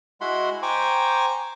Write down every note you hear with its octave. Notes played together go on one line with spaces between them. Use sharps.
G#3 E4 F#4 F#5 B5 C6
C5 G5 G#5 A#5 C#6 D6